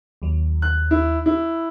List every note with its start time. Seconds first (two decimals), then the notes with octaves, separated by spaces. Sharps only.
0.22 D#2 F#3
0.62 F#6
0.91 E4
1.26 E4